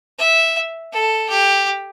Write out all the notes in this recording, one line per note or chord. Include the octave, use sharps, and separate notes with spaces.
E5
A4
G4